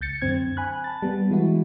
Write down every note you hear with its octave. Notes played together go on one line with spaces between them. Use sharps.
C#2 G6 A6 C#7
F#2 D3 C4 G#6
G#5 B5 F#6
A5 A6
G3 B3
E3 G#3 B3 E4 F#4